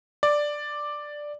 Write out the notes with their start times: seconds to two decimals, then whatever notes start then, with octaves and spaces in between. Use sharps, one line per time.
0.23 D5